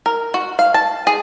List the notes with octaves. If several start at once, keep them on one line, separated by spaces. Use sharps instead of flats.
A#4
F#4
F5
A5
G#4